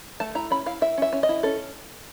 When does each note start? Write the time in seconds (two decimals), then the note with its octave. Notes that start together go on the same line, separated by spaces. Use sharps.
0.20 A3 A5
0.35 E4 A#5
0.51 C#4 B5
0.66 E4 F5
0.82 E4 E5
0.98 C#4 E5
1.13 C#4
1.23 D#5
1.29 E4
1.43 C#4 A4